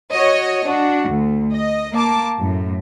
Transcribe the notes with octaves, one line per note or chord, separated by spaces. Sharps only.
F#4 C#5 D#5
D4 F#4
D2
D#5
A#3 A5 D6
F#2 A2